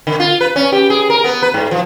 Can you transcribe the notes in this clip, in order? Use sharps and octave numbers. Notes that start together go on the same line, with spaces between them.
D3
F4
B4
C#4
G4
G#4
A#4
B3
B4
G#2
F3